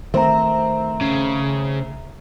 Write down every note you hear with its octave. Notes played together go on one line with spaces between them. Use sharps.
D#3 A3 C4 E5 A#5
C#3